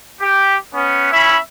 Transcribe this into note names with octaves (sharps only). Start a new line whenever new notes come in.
G4
B3 C#4
C#4 E4 E5 B5